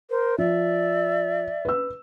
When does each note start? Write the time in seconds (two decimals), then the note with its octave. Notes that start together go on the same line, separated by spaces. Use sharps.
0.10 A#4 C5
0.38 F3 D5 E5
1.65 B4 E6